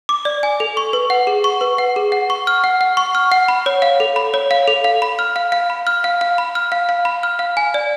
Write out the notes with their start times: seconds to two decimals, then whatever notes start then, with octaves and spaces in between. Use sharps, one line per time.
0.09 D6
0.25 D5
0.43 G#5
0.60 A4
0.77 C#6
0.93 B4
1.10 F#5
1.27 G#4
1.44 C#6
1.61 B4
1.78 F#5
1.96 G#4
2.12 F#5
2.30 C#6
2.47 F6
2.64 F#5
2.81 F#5
2.97 C#6
3.15 F6
3.32 F#5
3.48 B5
3.66 C#5
3.82 F5
4.00 A4
4.16 B5
4.34 C#5
4.51 F5
4.68 A4
4.84 F5
5.02 B5
5.19 F6
5.36 F5
5.52 F5
5.70 B5
5.87 F6
6.04 F5
6.21 F5
6.38 B5
6.55 F6
6.72 F5
6.89 F5
7.05 B5
7.23 F6
7.39 F5
7.57 G#5
7.74 D5